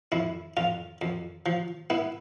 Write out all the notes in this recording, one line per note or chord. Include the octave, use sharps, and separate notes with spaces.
F2 E4
F2 F4
F2
F3
B3 E4